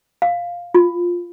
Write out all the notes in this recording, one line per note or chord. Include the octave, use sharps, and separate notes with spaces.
F5
F4